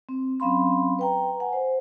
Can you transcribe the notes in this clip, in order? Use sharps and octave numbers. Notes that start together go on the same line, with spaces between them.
C4
F#3 C4 C#4 F5 B5 C6
B4 G5 A#5
F#5 G#5
C5